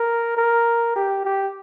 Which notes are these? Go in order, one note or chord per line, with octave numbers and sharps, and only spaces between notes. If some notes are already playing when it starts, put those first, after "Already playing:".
Already playing: A#4
A#4
G4
G4